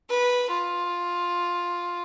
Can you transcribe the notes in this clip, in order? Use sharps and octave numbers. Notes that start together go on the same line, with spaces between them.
B4
F4